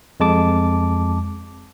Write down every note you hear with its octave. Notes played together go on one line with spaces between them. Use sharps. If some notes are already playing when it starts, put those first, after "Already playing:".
F2 G#3 A5 D6